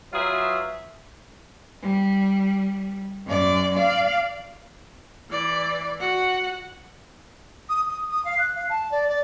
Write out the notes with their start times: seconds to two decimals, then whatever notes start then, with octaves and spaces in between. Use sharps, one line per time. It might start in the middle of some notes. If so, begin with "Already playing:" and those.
0.12 F#3 F4 G#4 B4 E5
1.82 G3
3.26 F#2 D5
3.75 D5 F5
5.31 E3 D5
6.01 F#4 F#5
7.69 D#6
7.89 D#6
8.09 D#6
8.25 F5
8.38 F#6
8.55 F5
8.69 A5
8.91 D5
9.09 D5